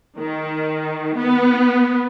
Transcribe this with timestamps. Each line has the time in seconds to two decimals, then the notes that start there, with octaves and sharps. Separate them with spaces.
0.18 D#3
1.17 B3